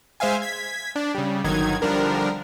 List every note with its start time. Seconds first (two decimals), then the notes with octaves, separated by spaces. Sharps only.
0.20 G#3 C5 E5 F5 G#5
0.42 G#6 B6
0.96 D4
1.15 C#3 G3
1.44 G1 D#3 F#3 D#4 G#6
1.82 D3 F3 G3 D4 A#4